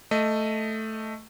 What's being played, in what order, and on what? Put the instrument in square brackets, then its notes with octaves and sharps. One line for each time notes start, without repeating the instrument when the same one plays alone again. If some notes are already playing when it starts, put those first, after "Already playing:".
[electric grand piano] A3 D#5